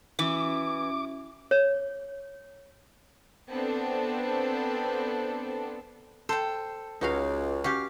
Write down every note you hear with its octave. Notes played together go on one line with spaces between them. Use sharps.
E3 C#4 F#4 E5 D6
C#5
B3 C4 D4 A4
A4 C5 G5
C#2 D#4 F#4 F5
C#4 F#4 G4 F5